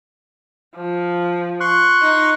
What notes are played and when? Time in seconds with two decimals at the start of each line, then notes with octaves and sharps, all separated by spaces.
0.76 F3
1.60 C6 C#6 F#6
2.02 D#4